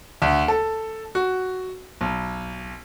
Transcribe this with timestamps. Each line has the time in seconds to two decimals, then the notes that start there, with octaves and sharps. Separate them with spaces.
0.22 D2
0.48 A4
1.15 F#4
2.01 B1